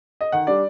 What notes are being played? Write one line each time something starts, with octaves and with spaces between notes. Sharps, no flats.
D#5
D#3 F#5
G3 D4 D5